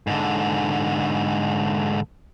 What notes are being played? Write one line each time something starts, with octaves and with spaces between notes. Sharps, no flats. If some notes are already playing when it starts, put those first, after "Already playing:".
G#2 D3